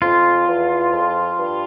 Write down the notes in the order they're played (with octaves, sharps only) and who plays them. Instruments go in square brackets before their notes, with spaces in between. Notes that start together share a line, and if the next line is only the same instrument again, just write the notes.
[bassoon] F2 [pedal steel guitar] F4
[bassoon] E2
F2
G2